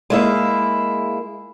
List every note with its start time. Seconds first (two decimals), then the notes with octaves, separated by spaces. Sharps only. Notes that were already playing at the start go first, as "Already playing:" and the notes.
0.10 G#3 A#3 E4